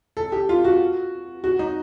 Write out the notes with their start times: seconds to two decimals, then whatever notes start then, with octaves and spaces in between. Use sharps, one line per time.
0.17 A4
0.32 G4
0.49 F4
0.65 F#4
1.44 F#4
1.59 D#4